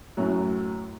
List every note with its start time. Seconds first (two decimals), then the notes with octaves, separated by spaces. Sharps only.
0.17 F#2 A2 F#3